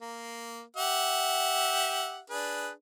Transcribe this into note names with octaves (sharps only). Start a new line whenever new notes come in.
A#3
G4 E5 F#5
D4 G#4 B4